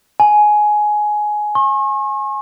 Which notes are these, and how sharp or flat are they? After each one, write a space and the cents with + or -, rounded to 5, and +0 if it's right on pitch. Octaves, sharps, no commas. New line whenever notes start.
G#5 +15
C#6 -45